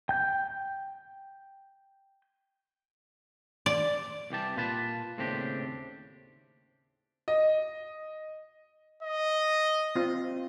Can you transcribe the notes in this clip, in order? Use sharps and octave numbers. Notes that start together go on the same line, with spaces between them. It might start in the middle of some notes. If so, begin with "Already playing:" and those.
G5 G6
D5
C2 E3 G4 A5
A#2 F4 B4 A5
D#2 A2 C#3 C4 D4 G4
D#5
D#5
C4 F4